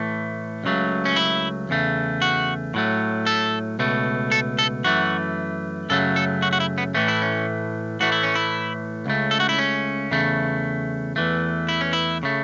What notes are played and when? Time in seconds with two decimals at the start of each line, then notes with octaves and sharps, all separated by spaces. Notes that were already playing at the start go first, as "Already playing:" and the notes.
Already playing: A2 E3 A3
0.64 C#2 C#3 F#3 A3
1.05 C#4
1.16 E4
1.69 E2 C#3 A3
2.22 F#4
2.74 A2 F#3 A3
3.27 A4
3.79 C#2 B2 A3
4.32 A4
4.59 A4
4.84 F#2 E3 A3 F#4
5.89 F#2 C#3 F#3 A3 A4
6.16 A4
6.42 F#4
6.53 F#4
6.60 E4
6.78 B3
6.95 A2 E3 A3 C#4
7.08 E4
7.22 C#4
8.00 A2 E3 A3 F#4
8.12 E4
8.23 C#4
8.35 E4
9.06 C#2 C#3 A3
9.31 A4
9.40 F#4
9.49 E4
9.59 C#4
10.11 E2 C#3 A3
11.16 E2 E3 A3
11.69 E4
11.81 C#4
11.93 E4
12.23 C#3 A3